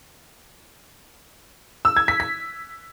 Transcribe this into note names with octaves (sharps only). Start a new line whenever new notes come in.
E6
G#6
B6
B6